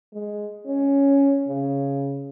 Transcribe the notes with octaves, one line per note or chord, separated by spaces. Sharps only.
G#3
C#4
C#3